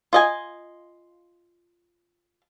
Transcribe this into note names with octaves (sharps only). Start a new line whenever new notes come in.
F4 D#5 G#5